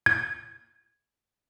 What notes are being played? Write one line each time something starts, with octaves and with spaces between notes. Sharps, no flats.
G#6